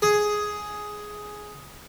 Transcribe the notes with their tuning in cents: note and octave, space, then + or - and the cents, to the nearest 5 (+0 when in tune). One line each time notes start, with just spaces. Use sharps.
G#4 +5